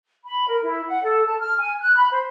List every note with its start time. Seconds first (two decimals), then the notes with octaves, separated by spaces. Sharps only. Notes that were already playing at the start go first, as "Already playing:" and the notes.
0.25 B5
0.49 A#4
0.63 E4
0.87 F#5
1.04 A4
1.26 A5
1.39 F6
1.58 G#5
1.80 F#6
1.97 B5
2.11 C5